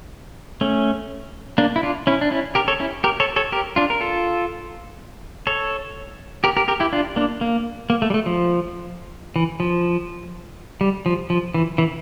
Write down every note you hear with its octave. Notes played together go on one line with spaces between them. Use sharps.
A3 C#4
A#3 D4
E4
D4 F4
C#4 E4
D4
C#4 E4
G4 A#4
A4 C#5
C#4 E4
G4 A#4
A4 C#5
A4 C#5
G4 A#4
D4 F4
A#4
F4 A4
A4 C#5
G4 A#4
G4 A#4
G4 A#4
E4 G4
D4 F4
A#3 D4
A#3
A#3
A3
G3
A3
F3
E3
F3
G3
F3
F3
E3
E3